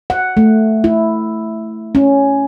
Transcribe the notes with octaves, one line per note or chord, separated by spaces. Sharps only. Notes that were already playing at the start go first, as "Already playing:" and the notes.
F#5
A3
E4
C#4